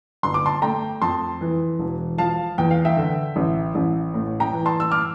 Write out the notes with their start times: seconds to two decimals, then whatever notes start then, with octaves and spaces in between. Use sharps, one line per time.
0.23 G1 C6
0.34 D6
0.46 A5 C6
0.62 A3 G5 A#5
1.02 F2 A5 C6
1.41 E3
1.79 E1
2.18 F3 F5 A5
2.58 E2 G5
2.71 F5
2.85 E5 G5
2.97 D3
3.36 A1
3.75 A1
4.14 A2
4.40 G5 A#5
4.53 E3
4.66 A5 C6
4.80 E6
4.91 D6 F6